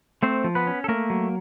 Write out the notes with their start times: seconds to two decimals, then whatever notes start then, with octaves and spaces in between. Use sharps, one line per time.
0.23 A3 C4 C5
0.44 F3
0.55 B3 B4
0.67 C#4
0.84 A4
0.88 A3 A#3 A#4
1.10 F#3